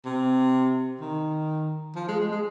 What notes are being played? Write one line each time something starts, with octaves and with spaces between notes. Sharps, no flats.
C3
D#3
F3
G#3
G#3
G#3